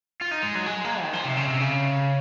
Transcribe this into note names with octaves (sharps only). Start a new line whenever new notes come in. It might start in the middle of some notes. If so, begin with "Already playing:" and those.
F4
D#4
G#3
F#3
G#3
A#3
D#3
F3
C3
C#3
C3
C#3